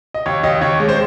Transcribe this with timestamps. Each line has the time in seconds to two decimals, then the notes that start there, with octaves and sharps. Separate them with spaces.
0.14 D#5
0.26 D#2 C#5
0.43 D#2 D#5
0.61 D#2 C#5
0.80 G#3
0.89 C5